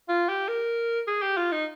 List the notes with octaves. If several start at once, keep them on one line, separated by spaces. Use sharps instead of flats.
F4
G4
A#4
G#4
G4
F4
D#4